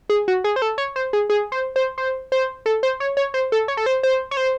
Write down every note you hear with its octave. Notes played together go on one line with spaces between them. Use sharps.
G#4
F#4
G#4
C5
A4
C#5
C5
G#4
G#4
C5
C5
C5
C5
A4
C5
C#5
C#5
C5
A4
C#5
A4
C5
C5
C#5
C5